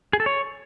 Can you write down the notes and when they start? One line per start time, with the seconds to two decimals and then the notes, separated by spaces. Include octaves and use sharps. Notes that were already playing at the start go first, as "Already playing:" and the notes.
0.13 G#4
0.20 A4
0.26 C#5